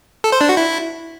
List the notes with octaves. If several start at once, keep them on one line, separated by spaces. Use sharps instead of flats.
A4
C5
D4
F#4
E4